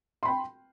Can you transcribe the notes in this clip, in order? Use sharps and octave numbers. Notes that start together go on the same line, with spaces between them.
G5 B5 C6